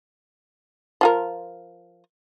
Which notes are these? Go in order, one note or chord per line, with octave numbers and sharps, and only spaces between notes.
F3 F4 A#4